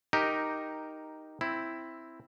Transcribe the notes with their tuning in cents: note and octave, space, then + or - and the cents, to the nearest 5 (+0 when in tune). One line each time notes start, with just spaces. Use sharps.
D#4 +0 G4 -5 A#4 +0
C4 +0 E4 +0